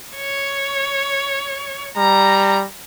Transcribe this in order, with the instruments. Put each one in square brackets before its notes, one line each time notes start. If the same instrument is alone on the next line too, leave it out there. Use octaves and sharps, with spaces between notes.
[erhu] C#5
[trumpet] G3 [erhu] A#5